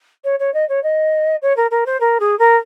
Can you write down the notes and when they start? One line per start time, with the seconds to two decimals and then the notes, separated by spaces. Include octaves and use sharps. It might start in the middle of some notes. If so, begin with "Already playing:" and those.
0.24 C#5
0.39 C#5
0.54 D#5
0.69 C#5
0.83 D#5
1.42 C#5
1.56 A#4
1.71 A#4
1.86 C5
2.00 A#4
2.20 G#4
2.39 A#4